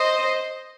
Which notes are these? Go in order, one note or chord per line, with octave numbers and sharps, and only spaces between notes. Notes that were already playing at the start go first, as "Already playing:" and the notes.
Already playing: C5 D#5